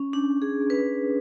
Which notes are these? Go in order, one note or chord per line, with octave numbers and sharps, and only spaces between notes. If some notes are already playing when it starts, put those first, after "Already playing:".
Already playing: C#4
D4
G#4
B4